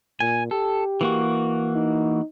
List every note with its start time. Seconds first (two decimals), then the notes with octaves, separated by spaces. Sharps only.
0.20 A#2 G#5
0.51 G4 A4
1.01 E3 A#3 F#4
1.74 D#4